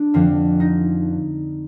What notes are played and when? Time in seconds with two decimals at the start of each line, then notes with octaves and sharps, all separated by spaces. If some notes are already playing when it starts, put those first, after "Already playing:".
Already playing: A3 D4
0.14 F2 D3 F3 C4
0.60 D#4